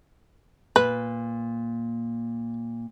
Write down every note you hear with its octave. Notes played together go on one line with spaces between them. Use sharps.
A#2 B4